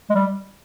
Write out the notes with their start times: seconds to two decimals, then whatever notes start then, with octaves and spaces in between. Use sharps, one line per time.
0.10 G#3
0.15 G3